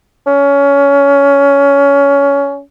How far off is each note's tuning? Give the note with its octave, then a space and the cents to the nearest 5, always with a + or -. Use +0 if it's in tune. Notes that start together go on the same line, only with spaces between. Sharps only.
C#4 +20